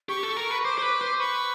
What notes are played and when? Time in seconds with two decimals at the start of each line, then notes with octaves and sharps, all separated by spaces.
0.09 G4 C#6
0.23 A4
0.37 A#4
0.51 B4
0.64 C5 D6
0.78 C5
0.82 B4
1.01 C5
1.19 B4 C#6